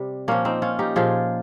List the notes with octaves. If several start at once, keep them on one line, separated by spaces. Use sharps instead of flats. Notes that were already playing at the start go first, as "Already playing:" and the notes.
Already playing: C3 G3
A#2 F3 A#3 C#4
C4 D#4
C#4 F4
D#4 G4
A#2 F3 F4 G#4